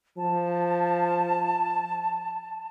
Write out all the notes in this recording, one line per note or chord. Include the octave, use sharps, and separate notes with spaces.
F3 A5